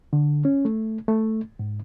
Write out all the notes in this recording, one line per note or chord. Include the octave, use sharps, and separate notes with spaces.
D3
C#4
A3
A3
G#2